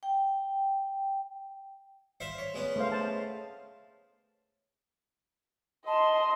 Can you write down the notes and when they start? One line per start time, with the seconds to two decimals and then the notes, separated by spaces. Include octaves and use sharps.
0.03 G5
2.20 C5 E5 F5
2.38 C#5
2.54 G#3 B3 C#4
2.76 A3 C5 F5
2.92 A5
5.87 D#5 A5 C6